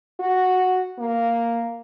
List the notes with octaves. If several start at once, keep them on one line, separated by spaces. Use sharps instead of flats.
F#4
A#3